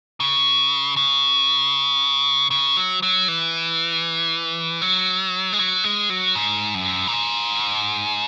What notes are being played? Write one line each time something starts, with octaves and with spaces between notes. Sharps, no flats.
C#3
C#3
C#3
F#3
F#3
E3
F#3
G#3
F#3
G#3
F#3
G#2
F#2
A#2
G#2